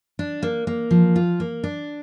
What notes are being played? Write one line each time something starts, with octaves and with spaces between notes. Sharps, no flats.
D4
A#3
A#3
F3
F4
A#3
D4